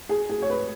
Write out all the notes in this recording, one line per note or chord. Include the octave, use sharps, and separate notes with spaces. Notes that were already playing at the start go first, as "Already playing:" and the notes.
G#4
G#4
C#5
B4